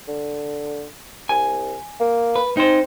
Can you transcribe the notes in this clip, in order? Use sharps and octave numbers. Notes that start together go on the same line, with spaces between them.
D3
C2 G#5
A#3
B4
C4 D#4 C5